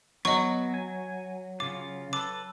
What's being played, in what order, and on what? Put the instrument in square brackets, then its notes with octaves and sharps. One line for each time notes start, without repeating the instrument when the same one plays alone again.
[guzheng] F#3 [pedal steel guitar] B3 [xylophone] D#5 C#6
[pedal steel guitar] G#5
[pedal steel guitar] C#3 F4 [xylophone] D6
[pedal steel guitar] A4 B4 [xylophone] D6